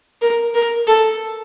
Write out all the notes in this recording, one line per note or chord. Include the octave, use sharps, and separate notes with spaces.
A#4
A#4
A4